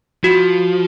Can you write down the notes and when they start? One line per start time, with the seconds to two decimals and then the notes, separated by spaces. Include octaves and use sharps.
0.24 F3 F#4